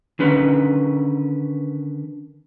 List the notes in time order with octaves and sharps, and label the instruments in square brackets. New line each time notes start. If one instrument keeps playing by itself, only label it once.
[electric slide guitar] D3 D#3 C#4 B4